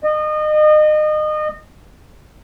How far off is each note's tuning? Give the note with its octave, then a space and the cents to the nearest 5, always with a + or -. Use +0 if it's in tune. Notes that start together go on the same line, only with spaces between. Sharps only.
D#5 -30